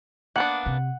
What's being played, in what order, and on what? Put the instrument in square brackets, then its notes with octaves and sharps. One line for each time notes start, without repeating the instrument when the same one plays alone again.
[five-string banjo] A#3 B3 D4 [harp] F#5
[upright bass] C3